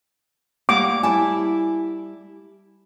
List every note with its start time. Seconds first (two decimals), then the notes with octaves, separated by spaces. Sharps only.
0.69 G3 A#3 F#5 D6
1.03 G3 E4 G#5 A5